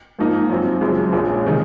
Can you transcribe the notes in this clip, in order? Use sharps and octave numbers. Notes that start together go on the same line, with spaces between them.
G#2 F3 A#3 D#4
F#2 F3 C4
F#1 F#2 F3 G#3
A#1 A#2 G#3 C#4
C3 D#3 G#3 D#4